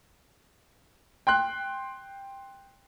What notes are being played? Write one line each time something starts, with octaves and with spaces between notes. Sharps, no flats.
G5 C6 F#6